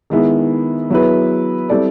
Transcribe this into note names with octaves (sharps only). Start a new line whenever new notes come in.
D#3 G#3 B3 E4
F#3 B3 E4 G#4 B4
G3 C4 E4 A4 D5